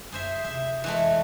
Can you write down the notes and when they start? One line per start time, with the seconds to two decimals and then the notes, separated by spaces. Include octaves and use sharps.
0.12 F#1 G#4 C5 E5
0.45 F2 C3 E5
0.84 E3 G#3 A3